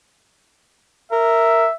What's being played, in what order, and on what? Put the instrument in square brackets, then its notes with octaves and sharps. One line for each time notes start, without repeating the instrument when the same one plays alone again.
[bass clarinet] A#4 [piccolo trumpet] E5